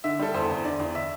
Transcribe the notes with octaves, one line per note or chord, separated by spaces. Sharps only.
D3 E5
G3 A4
E2 C5
E2
D3 D5
E2
E5